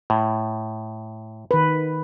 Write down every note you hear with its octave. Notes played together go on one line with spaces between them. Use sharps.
A2
D#3 B4